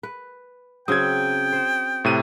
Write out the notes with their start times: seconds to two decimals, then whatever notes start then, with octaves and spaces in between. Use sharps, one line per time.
0.03 B4
0.88 C#3 F#3 C4 G5 D#6 G#6
1.52 C5
2.05 A2 C3 D#7